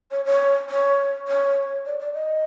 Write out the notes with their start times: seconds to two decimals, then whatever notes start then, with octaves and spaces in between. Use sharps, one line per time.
0.11 C#5
0.25 C#5
0.70 C#5
1.28 C#5
1.86 D5
1.99 D5
2.13 D#5